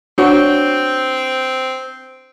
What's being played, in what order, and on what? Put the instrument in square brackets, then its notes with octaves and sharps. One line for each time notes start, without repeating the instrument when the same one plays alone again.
[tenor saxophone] C4 [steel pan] D4 F#4 C#5